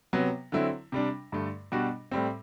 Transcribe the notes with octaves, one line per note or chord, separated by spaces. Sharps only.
C3 F#3 B3
D3 F#3 C4 E4
C3 G3 D4
G2 D3 A3
B2 G3 D4 F#4
A2 G3 C4